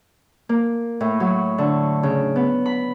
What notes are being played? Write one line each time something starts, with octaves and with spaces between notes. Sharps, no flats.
A#3
A2
F#3
D3
C#3
B3
B5